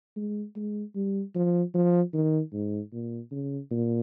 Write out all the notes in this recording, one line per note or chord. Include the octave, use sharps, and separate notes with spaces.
G#3
G#3
G3
F3
F3
D#3
G#2
A#2
C#3
A#2